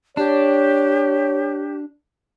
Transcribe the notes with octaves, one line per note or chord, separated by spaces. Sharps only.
D4 G4 C#5